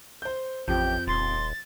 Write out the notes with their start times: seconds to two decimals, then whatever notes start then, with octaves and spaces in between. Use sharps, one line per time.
0.22 C5 G6
0.68 A1 F2 F3 G4 G6
1.07 D#1 C6 A6